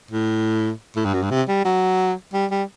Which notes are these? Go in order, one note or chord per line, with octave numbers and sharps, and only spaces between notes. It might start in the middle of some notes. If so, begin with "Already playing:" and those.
A2
A2
G2
F#2
G2
C3
G3
F#3
G3
G3